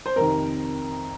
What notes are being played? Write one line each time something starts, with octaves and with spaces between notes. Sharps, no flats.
C5
F2 C3 D#3 A#4